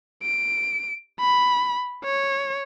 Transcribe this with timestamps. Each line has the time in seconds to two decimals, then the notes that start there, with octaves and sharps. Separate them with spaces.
0.23 D7
1.20 B5
2.04 C#5